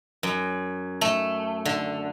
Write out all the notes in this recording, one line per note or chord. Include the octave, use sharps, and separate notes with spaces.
F#2
A3
D3